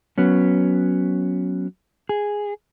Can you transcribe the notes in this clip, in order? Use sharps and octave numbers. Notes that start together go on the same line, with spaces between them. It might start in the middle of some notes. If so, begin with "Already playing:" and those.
F#3 B3 C#4
G#4